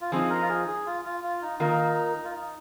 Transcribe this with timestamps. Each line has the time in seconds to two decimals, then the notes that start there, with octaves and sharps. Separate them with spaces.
0.01 F4
0.12 F3 C4 D#4 G#4
0.30 A#4
0.42 F4
0.49 G#4
0.68 G#4
0.86 F4
1.05 F4
1.24 F4
1.42 D#4
1.60 D#3 A#3 D#4 F4 A#4
2.25 F4
2.35 D#4